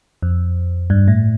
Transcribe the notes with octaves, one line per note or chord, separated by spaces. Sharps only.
F2
G2
A2